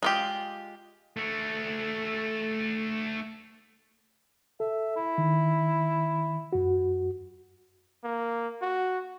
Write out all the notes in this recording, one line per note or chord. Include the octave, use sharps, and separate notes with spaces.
G#3 F4 G4
A3 F#4
A4 E5
E4
D#3
F#2 F#4
A#3
F#4